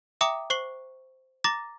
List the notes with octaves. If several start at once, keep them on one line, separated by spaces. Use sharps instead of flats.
E5 G5 A#5 D6 D#6
C5 C#6 C7 F#7 G7
A#5 D6 A6 A#6